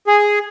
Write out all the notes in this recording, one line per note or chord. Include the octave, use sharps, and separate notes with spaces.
G#4